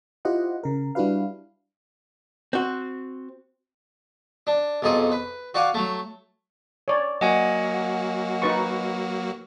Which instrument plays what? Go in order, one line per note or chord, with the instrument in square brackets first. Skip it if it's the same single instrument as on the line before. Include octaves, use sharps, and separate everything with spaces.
[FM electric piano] E4 F4 G4 C5 D#5 F#5
C#3 A#4
G3 D4 E4 F#4 B4 F5
[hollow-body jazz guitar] C4 F#4
[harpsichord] D4
B1 F2 D#4 G#4 D#6
B4
F#4 D5 F5 F#5 G#5
F#3 A3
[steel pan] C#5 D5
[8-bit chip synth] F#3 A#3 F#4 [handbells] D#5 F#5 G#5
[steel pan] D#4 B4 C#6